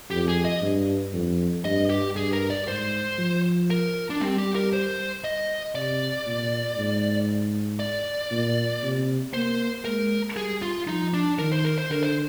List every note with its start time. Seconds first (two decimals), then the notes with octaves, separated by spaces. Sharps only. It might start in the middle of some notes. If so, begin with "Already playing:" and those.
0.11 F2 G4
0.28 G#4
0.45 D#5
0.62 G2
1.13 F2
1.64 G2 D#5
1.90 G4
2.16 G2 G#4
2.33 A#4
2.50 D5
2.67 G#2 C5
3.18 F3
3.70 A#4
4.10 D4
4.21 G3 C4
4.38 G4
4.55 A#4
4.73 C5
5.24 D#5
5.75 C3 D5
6.26 A#2
6.77 G#2
7.80 D5
8.32 A#2
8.83 C3
9.34 A#3 C5
9.85 G#3 A#4
10.37 G3 G#4
10.62 F4
10.87 F3 D#4
11.14 D4
11.39 D#3 A#4
11.52 C5
11.65 A#4
11.78 C5
11.90 D3 A#4
12.03 C5